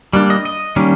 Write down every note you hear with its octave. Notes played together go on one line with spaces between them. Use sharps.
G3 A#3 D4
D#5
D#5
D#3 G3 A#3 C#4